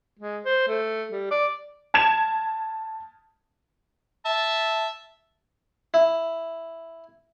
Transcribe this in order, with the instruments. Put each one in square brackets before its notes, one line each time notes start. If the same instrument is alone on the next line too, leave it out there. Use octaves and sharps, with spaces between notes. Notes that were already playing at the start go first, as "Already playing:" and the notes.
[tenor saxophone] G#3
C5
A3
G3
D5
[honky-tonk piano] A5 G#6 E7
[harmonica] E5 A5
[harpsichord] E4